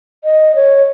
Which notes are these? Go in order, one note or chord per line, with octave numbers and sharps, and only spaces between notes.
D#5
C#5